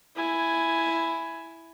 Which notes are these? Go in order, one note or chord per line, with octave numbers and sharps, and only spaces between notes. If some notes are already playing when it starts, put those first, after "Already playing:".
E4 G#5